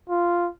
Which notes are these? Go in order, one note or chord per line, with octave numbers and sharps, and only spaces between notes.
F4